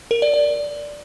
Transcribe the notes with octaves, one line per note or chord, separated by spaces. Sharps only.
A#4
D5
D5